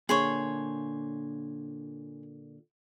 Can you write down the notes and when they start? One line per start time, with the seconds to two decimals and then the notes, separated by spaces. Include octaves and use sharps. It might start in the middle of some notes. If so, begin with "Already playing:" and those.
0.09 A#2 D3 A#3 G#4 C5 C#5